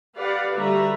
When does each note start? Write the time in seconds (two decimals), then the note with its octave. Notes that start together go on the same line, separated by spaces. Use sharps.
0.17 G4 B4 D5 F5 F#5
0.55 D3 G3 F#4 B4 E5 A#5